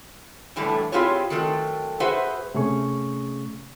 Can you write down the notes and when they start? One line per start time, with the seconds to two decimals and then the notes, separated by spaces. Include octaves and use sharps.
0.56 A2 D3 E3 F#3 G3 A3
0.92 C4 E4 F4 G4 G#4 C#5
1.30 D#3 F#3 A3 C4 F#4
2.00 F#4 G#4 B4 C5 E5 F#5
2.55 C3 A3 C#4 G#4 C#6